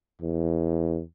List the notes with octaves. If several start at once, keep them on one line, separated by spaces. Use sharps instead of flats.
E2